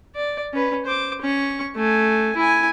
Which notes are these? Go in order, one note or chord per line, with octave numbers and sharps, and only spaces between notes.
D5
C#4 B4
C5 D6
C#4 C#6
A3 G#5
E4 G#5